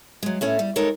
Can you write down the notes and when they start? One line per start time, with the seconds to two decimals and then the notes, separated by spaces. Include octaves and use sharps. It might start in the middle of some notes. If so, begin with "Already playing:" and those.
0.23 F#3 G#3
0.41 A2 A3 C#4
0.59 G3
0.76 G#3 D#4 A4 A#4 C#5